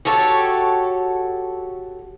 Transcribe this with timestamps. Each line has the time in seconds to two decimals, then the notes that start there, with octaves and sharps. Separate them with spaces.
0.05 F#4 G4 A4 C#5